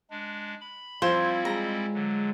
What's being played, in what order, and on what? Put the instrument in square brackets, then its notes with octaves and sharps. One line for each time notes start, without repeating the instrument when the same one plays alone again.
[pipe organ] G#3 D4
B5
[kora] F3 [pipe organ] G3 C4 E4 [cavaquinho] C5 [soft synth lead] G#6
[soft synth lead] G#3 [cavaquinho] A#5
[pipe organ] D3 F#3